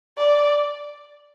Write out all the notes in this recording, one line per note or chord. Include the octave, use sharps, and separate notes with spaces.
D5